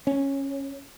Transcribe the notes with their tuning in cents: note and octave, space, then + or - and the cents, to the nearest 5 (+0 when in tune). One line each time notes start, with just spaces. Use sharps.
C#4 -10